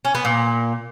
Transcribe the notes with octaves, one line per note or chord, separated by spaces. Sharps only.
C#4
B3
A#2